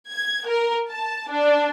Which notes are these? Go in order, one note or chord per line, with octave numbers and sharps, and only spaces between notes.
G#6
A#4
A5
D4